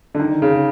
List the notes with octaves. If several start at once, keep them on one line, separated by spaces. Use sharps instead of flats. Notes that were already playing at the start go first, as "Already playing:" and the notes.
D3
D#3
C#3